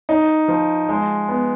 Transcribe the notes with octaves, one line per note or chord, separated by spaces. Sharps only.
D#4
F3
G#3
B3